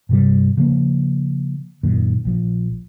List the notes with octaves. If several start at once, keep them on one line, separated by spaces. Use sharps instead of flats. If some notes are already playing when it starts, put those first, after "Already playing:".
G2 C3 G3
C#3 F3 A#3
F#2 A#2 D#3
A#1 F3